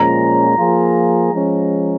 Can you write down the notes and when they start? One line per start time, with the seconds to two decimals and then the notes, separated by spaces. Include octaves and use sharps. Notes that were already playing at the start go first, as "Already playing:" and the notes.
Already playing: A#2 F3 G#3 C#4 A#5
0.57 F3 A#3 F4 G#4
1.32 F3 G#3 C#4